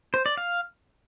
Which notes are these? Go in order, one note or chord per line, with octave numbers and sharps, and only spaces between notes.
C5
D5
F5